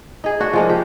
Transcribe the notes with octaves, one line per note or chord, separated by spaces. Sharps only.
D#4 G#4
D4 F#4
F3 G#3 A#3
G4